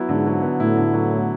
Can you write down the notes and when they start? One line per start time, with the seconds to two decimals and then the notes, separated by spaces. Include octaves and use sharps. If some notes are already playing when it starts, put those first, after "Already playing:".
Already playing: F#3 B3 E4
0.09 G#2 D3
0.26 F#3
0.42 B3
0.60 A2 E4
0.77 D3
0.93 F#3
1.11 B3